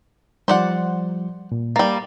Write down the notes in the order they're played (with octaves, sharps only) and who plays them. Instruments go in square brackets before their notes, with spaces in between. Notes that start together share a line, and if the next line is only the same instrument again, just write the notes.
[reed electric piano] F3 G3 [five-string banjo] C5 D5 F#5
[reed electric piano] A#2
[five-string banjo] G3 A#3 [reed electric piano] A6